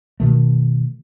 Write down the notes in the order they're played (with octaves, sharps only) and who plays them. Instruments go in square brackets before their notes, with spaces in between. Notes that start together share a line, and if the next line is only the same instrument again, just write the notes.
[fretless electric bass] B2 D#3 A3